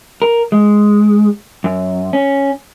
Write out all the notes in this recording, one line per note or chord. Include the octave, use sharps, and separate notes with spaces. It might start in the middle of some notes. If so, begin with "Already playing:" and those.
A#4
G#3
F#2
C#4